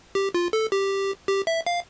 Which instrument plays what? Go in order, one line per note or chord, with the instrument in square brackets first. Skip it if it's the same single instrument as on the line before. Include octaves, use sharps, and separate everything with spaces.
[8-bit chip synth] G4
F4
A4
G4
G4
E5
F5